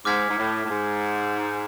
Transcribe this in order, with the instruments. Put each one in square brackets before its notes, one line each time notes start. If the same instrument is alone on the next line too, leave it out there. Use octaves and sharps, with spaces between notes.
[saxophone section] G#2 [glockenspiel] D6 F6 G#6 B6
[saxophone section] G#2
A2
A2
G#2